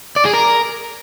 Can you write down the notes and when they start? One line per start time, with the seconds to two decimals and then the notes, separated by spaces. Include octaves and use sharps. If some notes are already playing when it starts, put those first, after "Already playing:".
0.16 D5
0.25 G#4
0.34 A#4